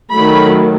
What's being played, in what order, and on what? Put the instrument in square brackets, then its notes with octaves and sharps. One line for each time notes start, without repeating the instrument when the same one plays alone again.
[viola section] D#3 F#3 A3 B5